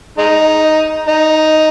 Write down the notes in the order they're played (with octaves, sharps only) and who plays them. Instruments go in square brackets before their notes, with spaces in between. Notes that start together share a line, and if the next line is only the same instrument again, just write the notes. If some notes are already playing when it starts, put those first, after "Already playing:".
[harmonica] G#3 D#4
D#4